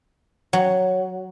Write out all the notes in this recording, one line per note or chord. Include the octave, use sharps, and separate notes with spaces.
F#3